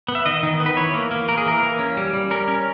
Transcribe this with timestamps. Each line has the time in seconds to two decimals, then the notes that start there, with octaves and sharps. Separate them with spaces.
0.08 B3
0.15 E5
0.26 D#3 D#5
0.43 D#3
0.60 B3
0.66 B4
0.77 E3 C#5
0.94 A#3
1.11 A#3
1.28 A#3 A#4
1.38 G#4
1.46 E3 A#4
1.63 A#3
1.79 C#4
1.97 G3
2.13 G3
2.31 C#4 A#4
2.48 C#4